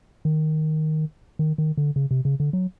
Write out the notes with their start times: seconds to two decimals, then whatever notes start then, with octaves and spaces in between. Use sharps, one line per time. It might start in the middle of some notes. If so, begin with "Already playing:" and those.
0.25 D#3
1.39 D#3
1.58 D#3
1.77 D3
1.96 C#3
2.11 C3
2.25 C#3
2.40 D3
2.53 F#3